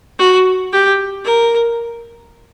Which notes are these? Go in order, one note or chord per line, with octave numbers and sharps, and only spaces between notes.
F#4
G4
A#4